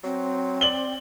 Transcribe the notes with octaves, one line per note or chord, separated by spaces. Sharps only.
F#3 C4
D5 F#7 G7